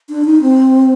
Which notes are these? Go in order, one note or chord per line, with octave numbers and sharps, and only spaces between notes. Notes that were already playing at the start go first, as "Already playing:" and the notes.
D4
D#4
C4